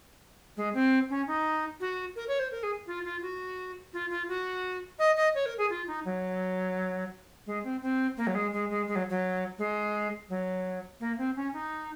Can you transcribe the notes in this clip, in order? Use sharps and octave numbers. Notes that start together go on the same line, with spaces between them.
G#3
C4
C#4
D#4
F#4
A#4
C#5
C5
A#4
G#4
F4
F4
F#4
F4
F4
F#4
D#5
D#5
C#5
A#4
G#4
F4
D#4
F#3
G#3
C4
C4
A#3
F#3
G#3
G#3
G#3
G#3
F#3
F#3
G#3
F#3
A#3
C4
C#4
D#4